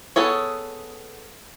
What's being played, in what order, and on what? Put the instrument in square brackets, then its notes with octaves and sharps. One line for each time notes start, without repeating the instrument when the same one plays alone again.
[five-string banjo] B3 G#4 A4 C#5